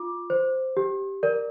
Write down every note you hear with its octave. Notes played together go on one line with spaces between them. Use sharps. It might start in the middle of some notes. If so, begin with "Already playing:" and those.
Already playing: F4 D6
C5
G4
A#4 D5